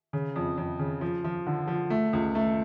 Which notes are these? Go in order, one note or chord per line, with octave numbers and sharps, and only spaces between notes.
C#3
F2
F2
C#3
F3
F3
D3
F3
A3
C#2
A3